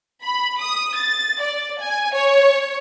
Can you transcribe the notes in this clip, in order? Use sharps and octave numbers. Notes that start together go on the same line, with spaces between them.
B5
D#6
A6
D5
G#5
C#5